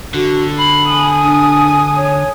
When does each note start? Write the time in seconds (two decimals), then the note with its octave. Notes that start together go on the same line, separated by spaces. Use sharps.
0.14 D3 F#4
0.58 B5 C7
0.89 G#5 D#6
1.23 D4
1.96 C#5